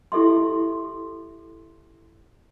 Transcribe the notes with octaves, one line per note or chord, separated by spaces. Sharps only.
E4 G4 A4 E5 C6